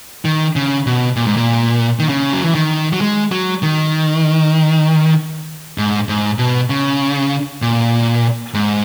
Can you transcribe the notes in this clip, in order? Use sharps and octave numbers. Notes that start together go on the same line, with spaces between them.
D#3
C#3
B2
A#2
G#2
A#2
D#3
C#3
F#3
E3
D#3
F#3
G#3
F#3
D#3
G#2
G#2
B2
C#3
A#2
G#2